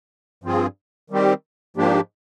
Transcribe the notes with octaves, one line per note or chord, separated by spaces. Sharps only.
G2 F3 C4 F4 G#4
D#3 G3 C4 G4
G#2 F3 A#3 D4 G4